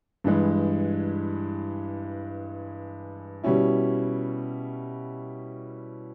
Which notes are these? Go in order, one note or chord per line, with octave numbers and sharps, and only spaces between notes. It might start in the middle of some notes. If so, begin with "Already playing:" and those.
G2 E3 G#3
B2 G3 C#4 E4